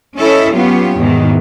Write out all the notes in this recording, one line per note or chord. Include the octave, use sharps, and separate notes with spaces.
C#4 E4 A4 C#5 D#5 E5
F#3 B3 C#4 F4 G4 C#5
E2 G#2 B2 D#3 E3